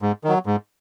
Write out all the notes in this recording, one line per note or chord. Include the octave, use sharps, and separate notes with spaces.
G#2
D#3 F#3
G#2